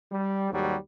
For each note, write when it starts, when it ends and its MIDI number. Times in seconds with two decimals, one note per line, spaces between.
0.11 0.49 55
0.50 0.74 39
0.50 0.74 44
0.50 0.74 54
0.50 0.74 55